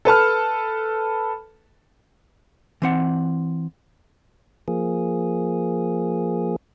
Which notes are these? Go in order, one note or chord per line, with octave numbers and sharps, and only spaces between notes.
A4 B4 A5 F6
E3 C4 F#5
F3 A#3 G#4